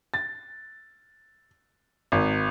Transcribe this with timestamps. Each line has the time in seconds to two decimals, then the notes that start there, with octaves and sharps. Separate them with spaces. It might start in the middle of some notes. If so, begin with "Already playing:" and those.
0.14 A6
2.12 G#1